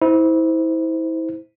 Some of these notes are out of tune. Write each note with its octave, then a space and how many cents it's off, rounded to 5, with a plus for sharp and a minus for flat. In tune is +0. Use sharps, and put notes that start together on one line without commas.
E4 -30 C5 -15